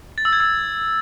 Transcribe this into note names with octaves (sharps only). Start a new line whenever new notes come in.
A6
E6
G#6
E6